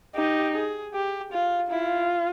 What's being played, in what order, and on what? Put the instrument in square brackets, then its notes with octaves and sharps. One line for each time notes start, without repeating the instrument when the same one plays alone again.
[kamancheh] D#4 [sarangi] G4
[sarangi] G#4
G4
F4
[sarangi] E4 [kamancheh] F4